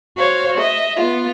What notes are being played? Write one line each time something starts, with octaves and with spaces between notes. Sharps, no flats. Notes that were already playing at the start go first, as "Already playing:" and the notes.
F#4 C5 C#5 F5
D#5 E5
B3 F4